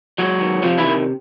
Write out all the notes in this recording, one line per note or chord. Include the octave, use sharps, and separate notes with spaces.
F#3 G#3 F#4
D#3
C3 F3 F4
E3 E4
D#3